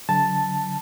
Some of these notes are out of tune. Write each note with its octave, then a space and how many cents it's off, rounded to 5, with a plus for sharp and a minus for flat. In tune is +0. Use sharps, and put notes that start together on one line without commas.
D3 -35 F#3 +0 A5 +0